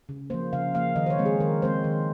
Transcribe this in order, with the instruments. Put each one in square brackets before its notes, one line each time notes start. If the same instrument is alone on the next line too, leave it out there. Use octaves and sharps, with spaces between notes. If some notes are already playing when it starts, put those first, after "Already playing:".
[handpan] C#3
F3 A#3 C5
C#3 F5
F3 A#3 F5
D#3 D#5
C5
C#5
G#3 C4
G#4
D#3 A#4
G#3 C4 C5
D#3